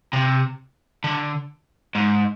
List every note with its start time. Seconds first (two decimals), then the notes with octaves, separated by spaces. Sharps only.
0.13 C3
1.04 D3
1.95 G#2